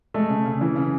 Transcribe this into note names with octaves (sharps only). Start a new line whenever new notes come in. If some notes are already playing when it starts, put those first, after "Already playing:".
G#3 A3
C#3
C#3
C#3 E3
C#3